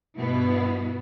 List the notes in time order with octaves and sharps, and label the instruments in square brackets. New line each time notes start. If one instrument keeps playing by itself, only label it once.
[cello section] G2 B2 B3 E4